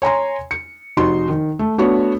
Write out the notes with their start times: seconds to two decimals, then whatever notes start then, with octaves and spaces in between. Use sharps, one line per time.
0.02 C#5 G#5 A#5 C6
0.51 C#7
0.97 F1 D#4 F#4 C6
1.28 D#3
1.59 A3
1.78 A3 B3 D4 F#4 C#5